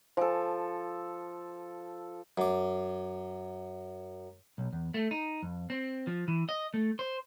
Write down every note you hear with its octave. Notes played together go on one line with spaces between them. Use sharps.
F3 A4 C5 G#5
F#2 D6
B1
E2
A3
D#4
F2
C4
F3
E3
D#5
A3
C5